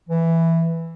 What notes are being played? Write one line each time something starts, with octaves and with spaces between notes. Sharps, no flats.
E3